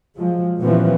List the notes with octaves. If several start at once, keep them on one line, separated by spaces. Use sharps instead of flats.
F3 F#3 G#3
A#2 E3 F3 G3 B3 C#4